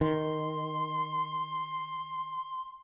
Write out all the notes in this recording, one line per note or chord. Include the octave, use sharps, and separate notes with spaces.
D#3 C6